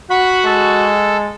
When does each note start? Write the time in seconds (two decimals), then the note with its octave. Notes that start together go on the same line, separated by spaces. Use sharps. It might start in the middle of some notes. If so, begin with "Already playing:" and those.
0.10 F#4 F#5 B5
0.45 G#3 A4